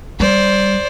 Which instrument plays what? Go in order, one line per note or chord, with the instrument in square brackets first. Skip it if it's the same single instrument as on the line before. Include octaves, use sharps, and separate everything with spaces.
[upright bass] G3 [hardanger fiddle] C5 D5